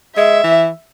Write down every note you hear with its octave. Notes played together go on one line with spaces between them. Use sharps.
G#3 E5
E3